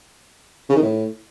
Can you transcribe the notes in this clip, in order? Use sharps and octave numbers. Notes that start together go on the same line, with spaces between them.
C#3
D#3
A2